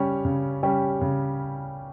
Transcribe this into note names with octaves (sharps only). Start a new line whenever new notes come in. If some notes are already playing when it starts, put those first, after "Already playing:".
Already playing: C#3 G3 C#4 G4 C#5
C#3
G3 C#4 G4 C#5
C#3